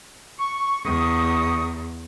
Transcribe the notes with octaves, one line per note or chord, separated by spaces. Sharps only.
C#6
E2 C#6 D#6